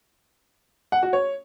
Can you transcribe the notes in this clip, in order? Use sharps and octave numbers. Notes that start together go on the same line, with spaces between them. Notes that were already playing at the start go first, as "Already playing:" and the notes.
F#5
F#4
C#5